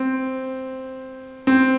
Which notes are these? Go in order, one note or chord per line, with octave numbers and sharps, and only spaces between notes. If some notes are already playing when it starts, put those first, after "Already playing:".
Already playing: C4
C4